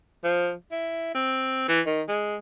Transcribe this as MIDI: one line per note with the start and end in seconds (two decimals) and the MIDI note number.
0.24 0.53 53
0.72 1.12 64
1.15 1.65 60
1.68 1.81 52
1.86 2.01 51
2.08 2.36 56